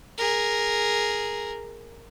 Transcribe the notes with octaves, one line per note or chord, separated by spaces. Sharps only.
G#4 A#4